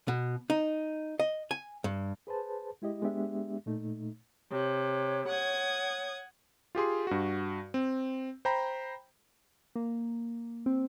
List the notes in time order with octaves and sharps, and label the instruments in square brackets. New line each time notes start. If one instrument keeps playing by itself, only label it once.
[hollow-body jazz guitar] B2
D#4
D#5
G#5
G2
[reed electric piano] G#4 B4 C5 A5
G#3 E4 G4 D#5
G#3 B3 D4 G4 E5
A#2 A3 D#4
[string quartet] C3 [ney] C#5
[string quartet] F#5 D#6 G#6
[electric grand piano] F4 G4 G#4 C6
G2 F#4
C4
C5 G5 A#5 B5
[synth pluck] A#3
C4